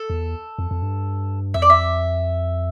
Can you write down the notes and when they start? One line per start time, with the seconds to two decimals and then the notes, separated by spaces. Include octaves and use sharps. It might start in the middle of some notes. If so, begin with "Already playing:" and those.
Already playing: A4
0.10 E2
0.59 F2
0.71 F2
0.82 G2
1.54 F2 E5
1.62 D5
1.70 E5